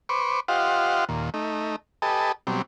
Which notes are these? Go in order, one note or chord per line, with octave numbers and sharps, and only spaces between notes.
B4 C5 C#6 D6
F4 G4 C5 D#5 F5 F#5
D#2 A#2
A3 D#4
G4 A4 B4 D#5 G#5 A5
B2 F#3 G3 C4